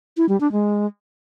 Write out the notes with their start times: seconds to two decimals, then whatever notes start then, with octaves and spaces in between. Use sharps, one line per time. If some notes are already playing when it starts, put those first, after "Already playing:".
0.17 E4
0.29 G3
0.40 D4
0.52 G#3